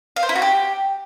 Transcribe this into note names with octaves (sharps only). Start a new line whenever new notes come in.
F5
C5
E4
F#4
G4